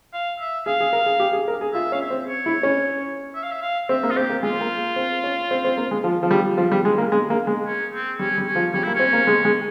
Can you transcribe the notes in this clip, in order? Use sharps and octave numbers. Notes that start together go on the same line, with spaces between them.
F5
E5
G#4 F5
G#4
A#4
G#4
G4
G#4
A#4
G#4
F4 E5
C#4 F5
E5
C4
C#5
E4
C#4
E5
F5
E5
F5
C4 E5
A#3
F4
C4 G4
A#3
G#3 F4
A#3
C4
C#4
C4
C4
A#3
G#3
F3
F3
G3
F3
G3
G#3
A#3
G#3
A#3
G#3
C#4
C4
G3 C#4
G3
C#4
F3
G3 C#4
A#3 E4
C#4
C4
A#3
G#3
G#3